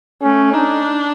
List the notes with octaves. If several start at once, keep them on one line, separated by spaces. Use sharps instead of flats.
A3 C#4
D4 D#4